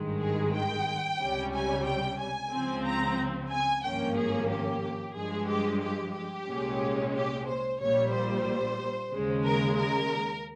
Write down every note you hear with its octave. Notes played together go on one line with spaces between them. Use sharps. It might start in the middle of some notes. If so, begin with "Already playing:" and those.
Already playing: G#1 G2 D#3 G#3
G#4
G5
C#2 C3 G3 C#4
G#5
G5
G#5
C#2 C#3 F3 C4
A#5
G#5
G#1 G2 F3 A#3 C#4 G5
G#4
G4
G2 F3 G#3 G#4
G4
G4
G4
C2 A#2 G#3 C#4
G4
C5
A#1 A#2 G3 C#5
C5
D#2 C#3 G#3
A#4
A#4